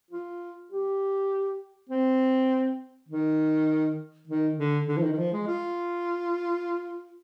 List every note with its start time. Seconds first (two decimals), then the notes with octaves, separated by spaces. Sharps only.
0.11 F4
0.71 G4
1.90 C4
3.09 D#3
4.28 D#3
4.58 D3
4.88 D3
4.97 F3
5.02 D#3
5.13 D#3
5.18 F3
5.32 G#3
5.47 F4